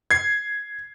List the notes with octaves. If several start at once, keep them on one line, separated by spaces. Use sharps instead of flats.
G#6 C7